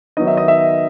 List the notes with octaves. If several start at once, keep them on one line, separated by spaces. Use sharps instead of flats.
D#3 F#3 B3 D#4 D#5
E5
D#5
E5